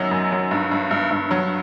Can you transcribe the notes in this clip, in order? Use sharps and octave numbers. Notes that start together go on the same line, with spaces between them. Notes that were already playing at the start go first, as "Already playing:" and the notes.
Already playing: F#2 F#3 D#4
F#2
F#3
G2
G2
G2
G2
F#3